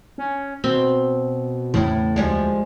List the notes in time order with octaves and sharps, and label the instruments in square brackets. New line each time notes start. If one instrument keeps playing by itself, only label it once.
[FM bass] C#4
[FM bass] B2 [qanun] C4
[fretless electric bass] E2 C#3 E3 [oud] A2
[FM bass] D2 [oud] F3 G3 G#3